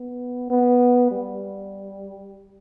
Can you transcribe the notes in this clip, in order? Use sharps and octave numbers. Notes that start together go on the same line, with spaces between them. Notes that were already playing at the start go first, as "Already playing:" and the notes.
Already playing: B3
B3
G3